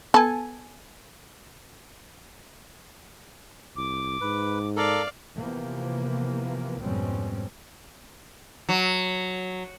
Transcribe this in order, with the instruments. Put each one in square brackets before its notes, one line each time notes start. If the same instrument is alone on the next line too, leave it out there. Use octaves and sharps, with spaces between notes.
[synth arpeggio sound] B3 G#5 [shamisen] A4
[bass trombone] C2 [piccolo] D6
[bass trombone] G#2 [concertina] B4
[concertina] A4 A#4 [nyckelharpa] D5 F5
[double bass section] C3 E3 F3 A#3 B3
F2 G#2 B2 G3 C4 C#4
[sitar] F#3